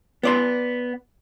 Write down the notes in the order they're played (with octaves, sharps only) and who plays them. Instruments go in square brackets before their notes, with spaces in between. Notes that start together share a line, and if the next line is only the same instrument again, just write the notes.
[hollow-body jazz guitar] B3 D5 C6